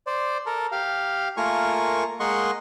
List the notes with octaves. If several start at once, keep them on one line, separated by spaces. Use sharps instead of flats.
C5 D5
A4 A#4
G4 F5
A3 A#3 F4 A#4 G#5 C#6
G#3 A#3 D#5 F#5 C6 C#6